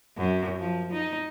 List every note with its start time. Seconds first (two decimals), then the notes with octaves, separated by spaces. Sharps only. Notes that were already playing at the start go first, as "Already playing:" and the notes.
0.17 F#2
0.59 F3
0.92 D#4